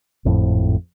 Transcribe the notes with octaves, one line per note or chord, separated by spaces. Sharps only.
G#1 F2 A2 F3